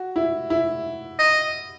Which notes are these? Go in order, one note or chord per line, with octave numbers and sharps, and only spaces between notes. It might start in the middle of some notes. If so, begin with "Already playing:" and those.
Already playing: F#4
E4
E4
D#5